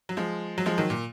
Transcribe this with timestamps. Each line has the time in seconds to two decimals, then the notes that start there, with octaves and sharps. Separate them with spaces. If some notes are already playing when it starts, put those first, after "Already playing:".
0.09 F#3
0.17 F3 G#3
0.58 F#3
0.66 F3 G#3
0.78 D#3 F#3
0.90 A#2